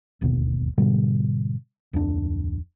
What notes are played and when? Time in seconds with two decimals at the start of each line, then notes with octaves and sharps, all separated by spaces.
0.21 D1 G1 D#2 B2
0.78 G#2 B2 D3 G3
1.93 D1 F2 D4